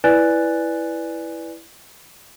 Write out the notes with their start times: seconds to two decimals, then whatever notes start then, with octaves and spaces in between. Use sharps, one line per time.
0.04 E4 B4 D5 G#5 F#6 A6